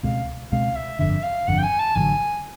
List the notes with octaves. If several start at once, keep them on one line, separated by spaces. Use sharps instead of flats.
C#2 B2 G#3 C4 F5
C#2 B2 G#3 C4 F5
E5
G1 F2 D3 E5
F5
G1 F2 D3 F#5
G5
G#5
A5
A1 G2 D3 F#3 G#5